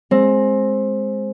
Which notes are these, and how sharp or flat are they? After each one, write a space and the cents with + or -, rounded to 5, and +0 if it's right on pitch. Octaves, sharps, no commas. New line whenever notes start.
G#3 +0 C4 +15